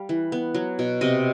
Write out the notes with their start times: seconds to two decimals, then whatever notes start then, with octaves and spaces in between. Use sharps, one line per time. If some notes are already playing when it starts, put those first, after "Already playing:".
Already playing: G3 F5
0.09 E3
0.32 B3
0.54 F#3
0.79 B2
1.01 C3 D#5